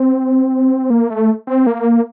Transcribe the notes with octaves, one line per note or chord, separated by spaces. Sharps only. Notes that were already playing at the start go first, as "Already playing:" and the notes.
Already playing: C4
A#3
A3
C4
A#3